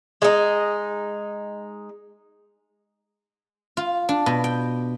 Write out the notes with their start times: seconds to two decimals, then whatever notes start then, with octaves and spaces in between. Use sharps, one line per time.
0.22 G#3 D#4
3.77 F4
4.09 D4
4.26 B2
4.44 G5